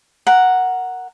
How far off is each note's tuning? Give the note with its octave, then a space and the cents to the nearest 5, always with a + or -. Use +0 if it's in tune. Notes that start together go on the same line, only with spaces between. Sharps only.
A#4 +0 F#5 +0